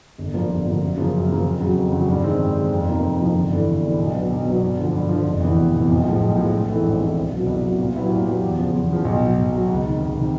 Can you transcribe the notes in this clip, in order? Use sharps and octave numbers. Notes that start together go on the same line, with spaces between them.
G1
G2 D3 F3 A#3
G1
G2 D3 F3 A#3
F#2
C#3 F3 A#3
F#2
C#3 F3 A#3
F2
C#3 F#3
F2
C#3 F#3
G2
D#3 G#3 C4
G2
D#3 G#3 C4
F2
C3 F3 A#3 D#4
F2
C3 F3 A#3 D#4
G1
G2 E3 A3
G1
G2 E3 A3
B1
B2 F#3 B3 D4
B1
B2 F#3 B3 D4
G2
D3 F3
G2
D3 F3
F1
E2 C3 E3
F1
E2 C3 E3
B1
A2 F3 G#3
B1
A2 F3 G#3
A#1
G#2 E3 A3 C4
A#1
G#2 E3 A3 C4
C2
B2 F#3
C2
B2 F#3
A#2
F#3 B3 E4 G4
A#2
F#3 B3 E4 G4
E2
C#3 F3
E2
C#3 F3
B1
B2 F#3
B1
B2 F#3
C#2
C3 D#3
C#2
C3 D#3